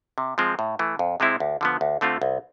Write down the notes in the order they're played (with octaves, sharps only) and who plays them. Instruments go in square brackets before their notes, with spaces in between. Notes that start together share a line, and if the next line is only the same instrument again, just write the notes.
[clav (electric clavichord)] C3
F3 G#3 C4
A2
E3 A3
F2
C3 G#3 C4 E4
D2
D3 F3 B3
D2
D3 A3 C4 F4
C2